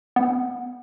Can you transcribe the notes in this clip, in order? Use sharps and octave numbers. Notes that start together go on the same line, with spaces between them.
B3